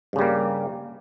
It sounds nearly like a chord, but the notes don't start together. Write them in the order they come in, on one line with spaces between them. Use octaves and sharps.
G2 C#3 G3 A#3